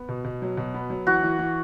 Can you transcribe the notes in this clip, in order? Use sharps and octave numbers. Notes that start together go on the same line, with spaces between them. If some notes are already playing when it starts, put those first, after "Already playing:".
Already playing: B3
B2
B2
F#3
B2
B3
F#3
E3 F#4
E3
E3